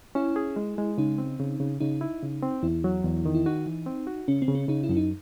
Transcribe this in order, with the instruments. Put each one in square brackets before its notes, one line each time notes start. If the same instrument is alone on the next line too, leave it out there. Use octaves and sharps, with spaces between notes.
[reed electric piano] C#4 [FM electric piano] E4
[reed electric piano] G#4
G#3
G#3
[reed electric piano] C#3 [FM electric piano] D#4
[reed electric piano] C4
C#3
C#3
[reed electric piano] C#3 [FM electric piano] D#4
[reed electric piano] E4
C#3
C4
[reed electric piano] E2 [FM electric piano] E4
[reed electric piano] F#3
E2
D#3
[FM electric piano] E4
[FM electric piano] D#4 [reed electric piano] F#4
[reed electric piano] E3
C4
F#4
[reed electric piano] C#3 [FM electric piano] C#4
[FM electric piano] C4
[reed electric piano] C#3
[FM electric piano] C#4
[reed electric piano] C#3 [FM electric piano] D#4
[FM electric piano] E4
[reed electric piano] F#2 [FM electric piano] C#4
[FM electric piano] D#4